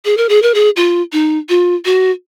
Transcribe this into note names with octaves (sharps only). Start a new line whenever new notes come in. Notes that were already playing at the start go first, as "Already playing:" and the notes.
G#4
A#4
G#4
A#4
G#4
F4
D#4
F4
F#4